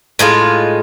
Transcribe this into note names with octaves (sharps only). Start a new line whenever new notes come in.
A2 G#3 D#4 F4